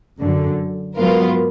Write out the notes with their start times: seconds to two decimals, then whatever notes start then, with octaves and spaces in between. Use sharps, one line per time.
0.19 F#2 D3 F#3
0.96 G#2 F#3 B3 F4 A#4